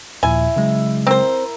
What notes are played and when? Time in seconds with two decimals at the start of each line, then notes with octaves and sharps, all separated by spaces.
0.23 D#2 A#2 F3 E4 G#5
0.56 C#3 F#3 G#3
1.07 C4 A#4 C5